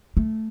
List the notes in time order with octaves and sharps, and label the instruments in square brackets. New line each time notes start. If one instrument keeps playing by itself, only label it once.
[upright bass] A3